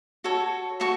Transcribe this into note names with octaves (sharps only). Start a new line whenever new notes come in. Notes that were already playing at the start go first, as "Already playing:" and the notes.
F#4 A4 C#5
F#4 A4 C#5 C#6